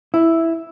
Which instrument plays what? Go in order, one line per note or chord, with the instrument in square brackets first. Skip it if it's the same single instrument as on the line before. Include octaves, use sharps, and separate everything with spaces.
[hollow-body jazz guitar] E4